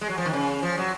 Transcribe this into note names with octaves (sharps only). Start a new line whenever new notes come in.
G#3
F#3
F3
D#3
C#3
F3
F#3